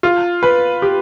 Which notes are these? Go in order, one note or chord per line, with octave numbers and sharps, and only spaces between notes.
F4
B4
G4